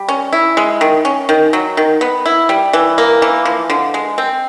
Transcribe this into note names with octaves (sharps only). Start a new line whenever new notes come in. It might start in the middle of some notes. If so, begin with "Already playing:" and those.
Already playing: G3
C#4
E4
G#3
D#3
C#4
D#3
F#3
D#3
B3
E4
G3
E3
A#3
E3
F3
D3
G#3
C4